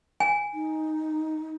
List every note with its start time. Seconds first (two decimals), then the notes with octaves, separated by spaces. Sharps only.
0.20 G#5
0.54 D#4